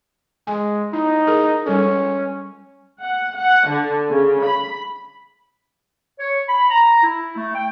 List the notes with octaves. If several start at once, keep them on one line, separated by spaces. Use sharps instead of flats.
G#3 G#5
D#4 E4
G#4 A#4
G3 C#4 A4
F#5
F#5
D3
C#3
B5
C#5
B5
A#5
E4
A3
G5